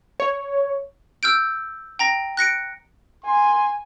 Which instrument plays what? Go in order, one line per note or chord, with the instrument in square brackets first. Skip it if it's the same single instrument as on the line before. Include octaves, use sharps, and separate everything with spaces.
[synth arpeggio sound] C#5
[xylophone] E6 F6 G6 D7
G5 A#5 A#6
F#6 A#6 C#7 D7
[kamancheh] G#5 [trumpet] C6